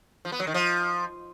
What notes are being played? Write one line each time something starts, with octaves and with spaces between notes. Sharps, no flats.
F3
B3
F#3
D#3
F3